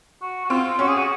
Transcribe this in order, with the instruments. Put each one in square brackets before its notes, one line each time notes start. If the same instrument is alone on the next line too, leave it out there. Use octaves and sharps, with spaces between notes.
[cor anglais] F#4
F#4
[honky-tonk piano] C4 [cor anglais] F4
[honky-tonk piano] C#4 [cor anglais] F#4
[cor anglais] G#4
F#4